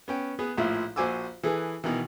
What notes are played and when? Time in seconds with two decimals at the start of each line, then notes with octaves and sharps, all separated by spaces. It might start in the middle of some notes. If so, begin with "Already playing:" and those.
0.08 B3 C#4 G5
0.39 B3 G#4 B4
0.57 A#1 A2 F3 E4
0.96 A#1 F#4 C5 G#5 D6 E6
1.43 E3 G#4 A4 B4
1.84 B2 D#3 E3